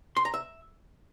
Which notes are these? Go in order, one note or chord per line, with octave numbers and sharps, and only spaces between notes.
C6
A#5
E5